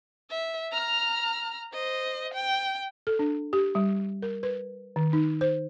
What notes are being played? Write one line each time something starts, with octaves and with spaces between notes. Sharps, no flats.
E5
A#5 F6
C5 D#5
G5
A4
D4
G4
G3
A#4
B4
D#3
D#4
C5